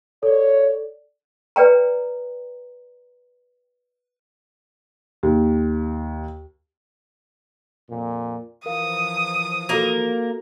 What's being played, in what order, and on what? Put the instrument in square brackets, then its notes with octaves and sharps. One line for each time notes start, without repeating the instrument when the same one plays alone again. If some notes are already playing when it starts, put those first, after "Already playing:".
[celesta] A4 D5 [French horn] C#5
[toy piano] B4 D5 G5 A#5
[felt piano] D#2
[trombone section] F2 A#2
[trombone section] E3 F3 [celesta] A#4 F5 [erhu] D#6
[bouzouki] A#3 A#4 [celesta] F4 F#4 A4